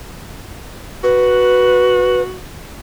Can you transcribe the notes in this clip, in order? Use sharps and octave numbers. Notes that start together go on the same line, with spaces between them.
F#4 B4